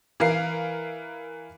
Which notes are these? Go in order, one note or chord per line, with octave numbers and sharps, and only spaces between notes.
E3 A#4 F5 C7